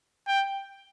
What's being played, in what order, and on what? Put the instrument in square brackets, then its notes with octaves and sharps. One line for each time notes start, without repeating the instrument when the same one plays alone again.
[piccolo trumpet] G5